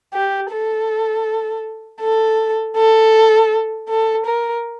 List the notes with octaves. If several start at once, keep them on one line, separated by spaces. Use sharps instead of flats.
G4
A4
A4
A4
A4
A#4